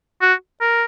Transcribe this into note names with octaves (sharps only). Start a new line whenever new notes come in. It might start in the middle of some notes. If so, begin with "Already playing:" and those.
F#4
A#4